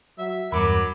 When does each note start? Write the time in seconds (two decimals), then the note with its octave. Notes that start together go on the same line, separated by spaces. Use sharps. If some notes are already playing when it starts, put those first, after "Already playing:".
0.18 F#3 E5
0.52 E2 G2 F#3 A#4 B5 D6